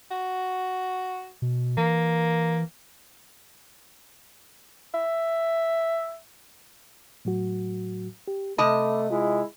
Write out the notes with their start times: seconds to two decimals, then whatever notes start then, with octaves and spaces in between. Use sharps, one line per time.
0.11 F#4
1.42 B2
1.77 E3 A#3
4.94 E5
7.25 A2 F#3 F#4
8.28 G4
8.58 C3 A3 D#5 A5 B5 D6
9.10 G#3 E4 F4